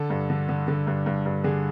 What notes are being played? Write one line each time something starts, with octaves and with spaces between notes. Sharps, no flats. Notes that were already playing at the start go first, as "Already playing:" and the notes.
Already playing: D3 A4
G2
D3
D3
D3
G2
G2
G2
D3 G#4